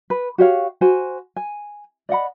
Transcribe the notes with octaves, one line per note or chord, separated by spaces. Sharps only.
B4
F#4 G4 C#5 F5
F#4 C5 G#5
G#5
D5 D#5 F#5 B5